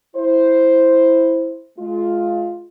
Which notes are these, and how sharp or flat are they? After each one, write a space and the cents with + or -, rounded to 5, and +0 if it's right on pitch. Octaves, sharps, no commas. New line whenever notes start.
E4 +0 C5 +0
G#3 +35 F4 +0